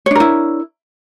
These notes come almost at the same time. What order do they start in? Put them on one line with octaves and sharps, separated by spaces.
C#5 D4 A#4 E4